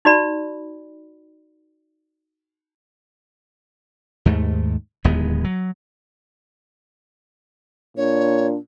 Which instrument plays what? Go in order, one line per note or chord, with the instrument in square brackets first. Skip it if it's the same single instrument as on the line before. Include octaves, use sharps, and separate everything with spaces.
[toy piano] D#4 F#4 D5 B5
[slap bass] D#2 G#2 A3
D1 D#2 G#3 B3
F#3
[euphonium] A#2 [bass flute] D4 [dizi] C#5